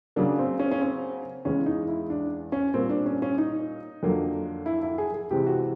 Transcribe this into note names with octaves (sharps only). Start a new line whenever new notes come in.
C#3 F#3 A#3 D4
C4
C#4
C#4
C4
E2 C#3 E3 G#3 C#4
D#4
E4
D4
C#4
A#2 G3 A#3 C4
D4
C#4
C#4
D#4
F2 D3 F#3 A#3
E4
E4
G#4
G#4
C3 E3 G#3 C4 G4
F#4